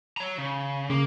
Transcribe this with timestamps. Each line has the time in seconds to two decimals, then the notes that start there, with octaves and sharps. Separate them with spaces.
0.17 C#5 A#5
0.38 C#3
0.90 C#3 A#3